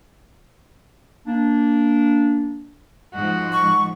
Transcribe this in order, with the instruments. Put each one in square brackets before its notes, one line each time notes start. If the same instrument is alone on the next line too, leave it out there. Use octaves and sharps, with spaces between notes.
[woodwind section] A#3 D4
[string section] G#2 F3 [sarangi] F#4
[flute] C#6